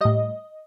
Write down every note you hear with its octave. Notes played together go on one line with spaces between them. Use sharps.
A2 G3 D#5